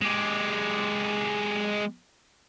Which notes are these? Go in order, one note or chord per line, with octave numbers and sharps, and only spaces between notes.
G#3 G4